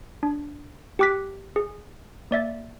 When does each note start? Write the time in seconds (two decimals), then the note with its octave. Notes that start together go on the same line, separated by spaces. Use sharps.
0.23 D4
0.99 G4 G5 D6 F#6 B6
1.56 G#4
2.31 A#3 D5 E5 A6